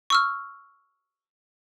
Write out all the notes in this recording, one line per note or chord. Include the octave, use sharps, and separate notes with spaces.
C#6 E6 F6